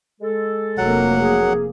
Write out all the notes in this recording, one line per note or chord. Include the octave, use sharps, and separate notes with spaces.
G#3 A4
F1 F#3 A#3 F#5
G#4